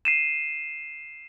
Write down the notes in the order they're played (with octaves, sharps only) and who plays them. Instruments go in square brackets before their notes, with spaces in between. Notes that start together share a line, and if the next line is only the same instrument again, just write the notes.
[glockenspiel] C7 D#7 E7